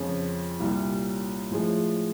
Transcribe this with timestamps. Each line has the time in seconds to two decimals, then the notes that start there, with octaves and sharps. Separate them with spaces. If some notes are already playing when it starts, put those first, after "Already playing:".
Already playing: F2 C#3 F3 G#3 C#4
0.60 C2 A#2 G3
1.51 A2 F3 G#3